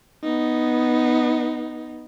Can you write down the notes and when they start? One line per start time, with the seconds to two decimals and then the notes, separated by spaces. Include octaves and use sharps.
0.23 B3 D#4